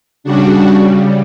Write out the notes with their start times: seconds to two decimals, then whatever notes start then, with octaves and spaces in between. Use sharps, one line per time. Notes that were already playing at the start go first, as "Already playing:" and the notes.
0.24 C#3 G3 D4 F#4